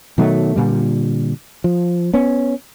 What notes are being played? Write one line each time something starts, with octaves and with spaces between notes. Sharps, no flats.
B2 D#3 F#3 A3
A#2 D3 G3
F3
B3 C#4